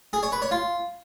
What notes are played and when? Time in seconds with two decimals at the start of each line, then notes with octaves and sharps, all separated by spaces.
0.13 G#4
0.23 C#5
0.32 B4
0.42 C#5
0.51 F4